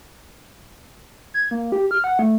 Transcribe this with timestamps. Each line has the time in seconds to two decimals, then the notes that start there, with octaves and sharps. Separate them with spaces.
1.34 G#6
1.51 A#3
1.72 G4
1.91 F6
2.04 F#5
2.19 A3